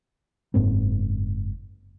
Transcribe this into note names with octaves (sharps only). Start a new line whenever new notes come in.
F#1 G#2 A#3 C4